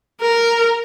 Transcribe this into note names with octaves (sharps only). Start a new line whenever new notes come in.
A#4